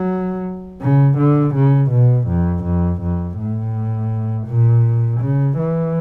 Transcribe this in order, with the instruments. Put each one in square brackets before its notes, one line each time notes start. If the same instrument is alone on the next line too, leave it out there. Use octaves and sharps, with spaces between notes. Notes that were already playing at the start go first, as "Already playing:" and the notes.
Already playing: [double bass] F#3
C#3
D3
C#3
B2
F2
F2
F2
A2
A#2
C#3
E3